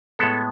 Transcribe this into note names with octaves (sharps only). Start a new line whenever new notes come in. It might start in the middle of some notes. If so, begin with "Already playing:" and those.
A2 G#3 B3 A4